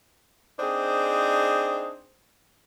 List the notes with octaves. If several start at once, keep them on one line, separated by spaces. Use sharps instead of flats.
C4 D4 D#4 G#4 C5